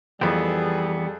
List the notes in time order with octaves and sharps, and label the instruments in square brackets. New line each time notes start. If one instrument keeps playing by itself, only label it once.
[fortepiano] F2 [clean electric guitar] E3 B3 [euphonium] G3 [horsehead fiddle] G#4 A4